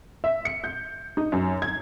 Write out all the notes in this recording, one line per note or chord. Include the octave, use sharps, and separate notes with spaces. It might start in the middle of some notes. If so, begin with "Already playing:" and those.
E5
C#7
G6
D#4
F#2
G#6